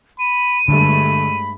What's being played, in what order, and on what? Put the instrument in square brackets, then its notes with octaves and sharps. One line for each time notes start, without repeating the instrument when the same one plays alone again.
[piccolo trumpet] B5 [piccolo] D#7
[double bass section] G2 G#3 A3 [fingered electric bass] D3 [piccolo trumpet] B5